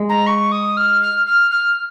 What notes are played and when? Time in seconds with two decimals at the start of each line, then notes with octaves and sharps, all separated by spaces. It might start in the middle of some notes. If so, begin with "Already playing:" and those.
Already playing: G#3
0.09 A#5
0.27 C#6
0.52 D#6
0.77 F6
1.01 F6
1.26 F6
1.51 F6